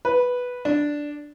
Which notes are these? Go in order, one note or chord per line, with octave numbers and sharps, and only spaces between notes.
B4
D4